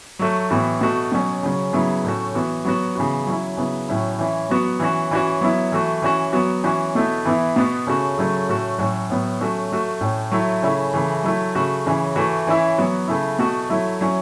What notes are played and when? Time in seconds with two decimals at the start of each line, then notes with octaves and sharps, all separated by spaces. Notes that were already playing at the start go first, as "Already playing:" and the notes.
0.19 F#3 A3 F#4
0.50 A2 E3 B3 F#4
0.81 B2 A3 F#4
1.12 B2 F#3 C#4
1.43 C#3 F#3 C#4
1.73 C#3 F#3 B3 E4
2.04 A2 A3 C#4 F#4
2.35 E3 B3 F#4
2.65 F#3 B3 F#4
2.95 C#3 E3 B3 F#4
3.27 F#3 C#4 E4
3.57 C#3 F#3 B3 E4
3.89 A2 F#3 C#4 E4
4.19 E3 C#4 E4
4.50 F#3 B3 F#4
4.80 E3 C#4 F#4
5.11 E3 C#4 F#4
5.41 F#3 B3 E4
5.72 E3 A3 F#4
6.02 E3 C#4 F#4
6.33 F#3 B3 F#4
6.64 E3 C#4 F#4
6.95 B2 A3 E4
7.25 E3 B3 E4
7.56 B2 B3 F#4
7.87 C#3 A3 C#4 F#4
8.18 C#3 F#3 A3 C#4
8.49 A2 A3 C#4 F#4
8.78 A2 F#3 C#4 F#4
9.10 A2 F#3 B3
9.40 F#3 A3 C#4 F#4
9.71 F#3 A3 F#4
10.01 A2 A3 C#4
10.32 F#3 A3 E4
10.63 C#3 A3 C#4 E4
10.93 C#3 E3 A3
11.24 F#3 A3 E4
11.55 C#3 A3 F#4
11.86 C#3 E3 C#4
12.16 E3 A3 F#4
12.47 E3 C#4 E4
12.78 F#3 B3 F#4
13.08 C#3 A3 E4
13.39 B2 A3 F#4
13.70 F#3 A3 E4
14.01 F#3 C#4 E4